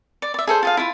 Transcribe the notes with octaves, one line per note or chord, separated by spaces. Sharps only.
D5
D5 E5
G#4 A4 C5
F4 G#4 F5
E4 F4